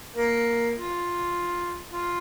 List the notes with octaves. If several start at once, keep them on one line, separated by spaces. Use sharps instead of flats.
A#3
F4
F4